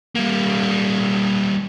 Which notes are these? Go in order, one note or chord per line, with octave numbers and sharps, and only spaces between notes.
G3 A#3